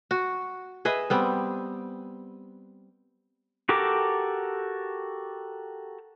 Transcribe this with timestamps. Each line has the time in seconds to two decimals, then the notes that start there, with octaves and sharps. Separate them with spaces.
0.11 F#4
0.85 G#4 B4 D#5 E5
1.10 G3 B3 C4
3.69 F#4 G4 A4 A#4 D6